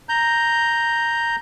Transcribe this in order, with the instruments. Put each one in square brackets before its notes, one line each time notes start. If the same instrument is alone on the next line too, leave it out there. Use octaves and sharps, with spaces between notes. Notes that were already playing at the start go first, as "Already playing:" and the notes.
[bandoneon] A#5 G6